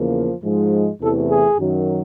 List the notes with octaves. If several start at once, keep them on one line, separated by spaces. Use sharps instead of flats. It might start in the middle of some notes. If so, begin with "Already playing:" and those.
Already playing: E2 C#3 F3 A#3
G#2 F3 G#3
E2 C3 E3 A3 A4
G#4
F#2 D#3 F#3